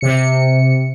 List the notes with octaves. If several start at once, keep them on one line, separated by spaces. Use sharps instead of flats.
C3 C#7